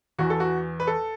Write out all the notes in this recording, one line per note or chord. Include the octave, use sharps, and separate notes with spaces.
E2 E3 F#4
A4
F#4
B4
A4